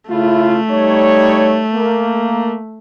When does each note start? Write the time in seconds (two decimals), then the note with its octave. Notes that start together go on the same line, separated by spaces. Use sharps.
0.10 C#3 A3 E4 F4
0.70 G3 D#4 C#5
1.74 A#3